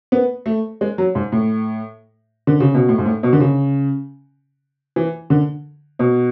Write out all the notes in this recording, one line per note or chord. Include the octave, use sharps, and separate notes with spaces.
B3
A3
G#3
F#3
G#2
A2
D3
C#3
B2
A2
G#2
A2
B2
D3
C#3
E3
D3
B2